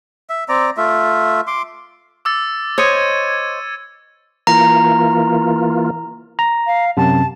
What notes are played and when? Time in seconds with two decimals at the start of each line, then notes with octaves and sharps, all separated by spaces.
0.30 E5
0.49 C4 D5 A#5
0.77 A3 F4 E5
1.47 C6 D6
2.25 D6 E6 A6
2.78 C5 C#5 D#5 G#6 C#7 D#7
4.47 E3 A#3 F4 A#5
6.39 A#5
6.67 F5
6.97 F#2 C3 A5